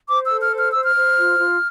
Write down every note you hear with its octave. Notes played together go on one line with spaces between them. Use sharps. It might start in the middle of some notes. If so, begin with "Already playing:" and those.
C5 D6
E6
A4
F6
C5
F6
C5 E6
F6
C5
F4
F4